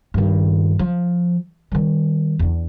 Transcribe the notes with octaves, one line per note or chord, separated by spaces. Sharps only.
G2 D#3
F3
D#3 G3
E2 D4